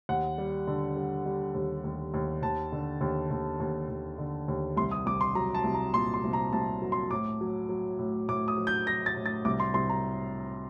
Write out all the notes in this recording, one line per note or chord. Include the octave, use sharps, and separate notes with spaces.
D#2 F#5
G3
D3
G3
G3
D#2
D#2
D#2
D#2 A5
D3
D#2
D#2
D#2
D#2
D3
D#2
C2 C6
D#6
C2 D6
C6
F#3 A#5
A5
C2
A#5
A#2 C6
C6
C2
A#5
C2 A5
F#3
C6
A2 D6
F#3
F#3
A2
A2 D6
D#6
F#3
G6
F#3 A#6
A6
A2
A6
C2 D6
C6
C2 C6
A#5